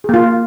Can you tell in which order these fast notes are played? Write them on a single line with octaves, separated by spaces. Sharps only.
G#4 A#3 F4